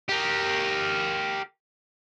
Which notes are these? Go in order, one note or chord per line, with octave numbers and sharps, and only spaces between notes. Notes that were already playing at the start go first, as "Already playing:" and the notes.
G4 A#4